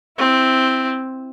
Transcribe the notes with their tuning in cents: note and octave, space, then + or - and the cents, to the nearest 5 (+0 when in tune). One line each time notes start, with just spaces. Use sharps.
C4 +0 E4 +0